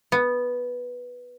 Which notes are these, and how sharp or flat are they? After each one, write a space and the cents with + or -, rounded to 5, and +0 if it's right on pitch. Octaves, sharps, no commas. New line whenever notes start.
B3 -5